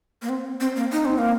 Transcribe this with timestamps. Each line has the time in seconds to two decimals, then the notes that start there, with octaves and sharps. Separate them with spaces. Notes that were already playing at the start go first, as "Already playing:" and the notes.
0.22 A#3
0.29 C4
0.60 C4
0.76 A#3
0.92 D#4
1.05 C4
1.18 A#3